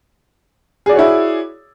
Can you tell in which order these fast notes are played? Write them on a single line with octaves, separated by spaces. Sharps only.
G#4 D5 F#4 C#5 E4